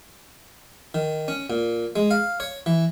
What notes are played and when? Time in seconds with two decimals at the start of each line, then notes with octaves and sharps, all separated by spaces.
0.94 D#3
1.28 C#4
1.50 A#2
1.96 G#3
2.11 F5
2.40 C#5
2.66 E3